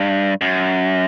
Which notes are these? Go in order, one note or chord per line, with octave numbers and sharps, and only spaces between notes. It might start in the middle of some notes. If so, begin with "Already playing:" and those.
Already playing: G2
F#2